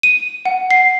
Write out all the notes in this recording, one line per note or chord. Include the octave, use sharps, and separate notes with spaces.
D#7
F#5
C7